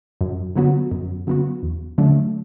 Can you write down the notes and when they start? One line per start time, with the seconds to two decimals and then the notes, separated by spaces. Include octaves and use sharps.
0.21 F#2
0.56 D3 F#3 B3 F#4
0.91 F#2
1.27 D3 F#3 B3 F#4
1.63 E2
1.98 D3 F#3 A3 D4